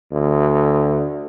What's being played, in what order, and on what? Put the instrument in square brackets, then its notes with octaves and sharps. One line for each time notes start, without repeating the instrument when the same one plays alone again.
[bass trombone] D2